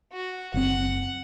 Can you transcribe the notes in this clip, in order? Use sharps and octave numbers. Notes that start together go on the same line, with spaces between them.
F#4
F#1 C3 C4 F#5